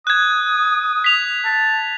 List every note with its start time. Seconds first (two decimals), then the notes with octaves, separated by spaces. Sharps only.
0.07 D#6 F#6 G#6
1.04 B6 F7
1.45 A5